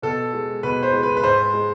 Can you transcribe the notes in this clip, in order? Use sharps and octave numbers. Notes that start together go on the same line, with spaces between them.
B2 A4
G#3
B2 B4
C5
G#3
B4
B4
G#2 C5
G#3